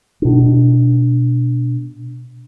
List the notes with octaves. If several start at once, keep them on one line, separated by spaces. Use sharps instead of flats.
B2 D4